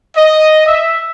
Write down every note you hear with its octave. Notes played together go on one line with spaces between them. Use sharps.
D#5
E5